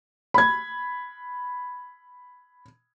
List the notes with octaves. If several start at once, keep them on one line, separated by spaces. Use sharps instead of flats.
B5 G#6